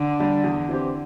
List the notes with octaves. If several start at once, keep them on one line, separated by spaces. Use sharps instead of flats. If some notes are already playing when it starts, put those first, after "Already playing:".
Already playing: D3
G3 D4 G4
E2
E3 C4 G4